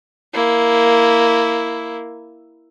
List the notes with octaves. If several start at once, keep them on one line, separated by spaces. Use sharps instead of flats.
A#3 E4